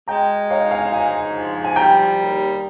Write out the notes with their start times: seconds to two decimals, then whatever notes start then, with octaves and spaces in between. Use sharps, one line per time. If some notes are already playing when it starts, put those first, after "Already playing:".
0.08 G#3 G5 A#5
0.50 D#4 C#5 F5
0.71 F5 G#5
0.92 G#2 F5 G#5
1.34 F3
1.64 G#5
1.76 G3 G5 A#5
2.19 D#2